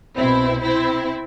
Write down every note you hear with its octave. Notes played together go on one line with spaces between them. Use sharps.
C2 B2 C4 E4
C4 E4